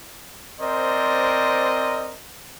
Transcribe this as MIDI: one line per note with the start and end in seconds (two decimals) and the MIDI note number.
0.61 2.16 60
0.61 2.16 70
0.61 2.16 72
0.61 2.16 74
0.61 2.16 75